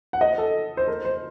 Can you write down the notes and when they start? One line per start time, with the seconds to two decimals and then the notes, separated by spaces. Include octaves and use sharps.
0.13 F#5
0.21 D#5
0.38 A4
0.77 C5
0.88 A#4
1.05 C5